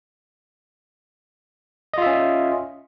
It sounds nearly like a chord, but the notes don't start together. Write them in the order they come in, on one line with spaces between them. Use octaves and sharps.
D#5 F4 E5 C#4